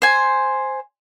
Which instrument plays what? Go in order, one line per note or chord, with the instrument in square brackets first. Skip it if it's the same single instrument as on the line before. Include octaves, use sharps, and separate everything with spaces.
[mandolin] C5 G#5